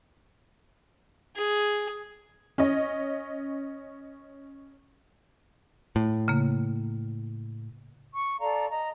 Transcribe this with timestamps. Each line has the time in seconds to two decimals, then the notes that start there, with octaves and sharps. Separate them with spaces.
1.36 G#4
2.58 C#4 D#5
5.96 A2
6.28 C#3 A#3
8.12 C#6
8.39 A4 D5 F5 A#5
8.70 D#5 A#5